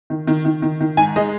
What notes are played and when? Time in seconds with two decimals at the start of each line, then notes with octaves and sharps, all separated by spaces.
0.10 D#3
0.27 D#3
0.45 D#3
0.62 D#3
0.81 D#3
0.97 G#2 G#5
1.16 G#3 D#5